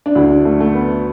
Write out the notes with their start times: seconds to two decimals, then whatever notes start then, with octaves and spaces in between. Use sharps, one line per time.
0.06 D4
0.15 D2 D3 E4
0.30 D4
0.45 A3
0.60 A3
0.75 B3